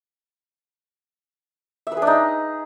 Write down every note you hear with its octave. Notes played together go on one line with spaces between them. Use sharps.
E5
B4
G#4
D4
D#4